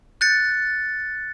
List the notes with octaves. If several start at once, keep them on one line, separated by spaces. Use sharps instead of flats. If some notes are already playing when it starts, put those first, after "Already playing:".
F#6 G6 A6 C#7